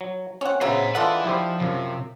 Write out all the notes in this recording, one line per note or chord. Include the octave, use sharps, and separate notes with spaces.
F#3
C4 C#4 C#5 F#5
C#3 F#3 G#3 B3 C5 E5 A#5
D3 G#3 E4 F4 A4 B4 E5 F#5
F3 E4 G4 C5
F#2 C3 F3